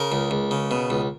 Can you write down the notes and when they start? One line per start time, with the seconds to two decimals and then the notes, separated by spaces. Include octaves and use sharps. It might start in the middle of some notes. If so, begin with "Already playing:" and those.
Already playing: C#3 A#4
0.12 C#2
0.31 C#2
0.51 C#3
0.71 B2
0.90 C#2